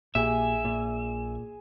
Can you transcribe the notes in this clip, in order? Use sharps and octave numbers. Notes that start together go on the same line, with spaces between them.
A#1 A#2 G4 G#4 E5 G#5
A#2